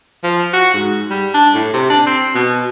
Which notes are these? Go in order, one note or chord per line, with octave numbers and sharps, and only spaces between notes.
F3
F#4
G#2
G3
D4
A2
C3
D4
C4
B2